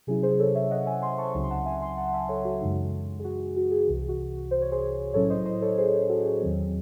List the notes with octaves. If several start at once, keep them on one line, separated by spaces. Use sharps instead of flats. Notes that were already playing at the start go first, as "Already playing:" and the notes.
C3 F#3 C#4 E4 G#4
G#4 C5
A4 C#5
C#5 E5
D#5 F#5
E5 G#5
G#5 C6
A5 C#6
C#2 C#3 F#3 C4 D#4
C6
F#5 A5
E5 G#5
G#5 C6
F#5 A5
F#5
E5 G#5
A4 C#5
F#4 A4
F#2 C#3 E3 G#3 D#4 F#4
G#4
F#4
F#4
F#4
G#4
C2 C3 E3
F#4
C5
C#5
G#4 C5
A2 F#3 C#4 E4 A4 C#5
C5 D#5
C5 D#5
A4 C#5
G#4 C5
F#4 A4
G#4
E2 D#3 F#3 C4